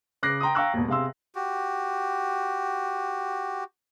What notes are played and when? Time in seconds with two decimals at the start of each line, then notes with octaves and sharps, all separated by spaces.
0.23 C#3 D6 F#6 A#6 C7
0.40 G5 A#5 C6 D#6
0.55 F5 G5 A#5 C#6 E6 F#6
0.74 E1 D#2
0.88 C3 G#4 F5 C6 E6
1.35 F#4 G4